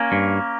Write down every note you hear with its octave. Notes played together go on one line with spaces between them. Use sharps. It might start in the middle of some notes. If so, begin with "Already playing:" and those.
Already playing: A#3 C#4
G2